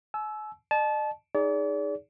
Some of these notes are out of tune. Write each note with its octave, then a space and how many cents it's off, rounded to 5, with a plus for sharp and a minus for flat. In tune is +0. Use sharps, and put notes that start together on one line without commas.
G#5 +45 E6 +0
D#5 -45 A5 -25
D#4 +0 G#4 +0 D5 -40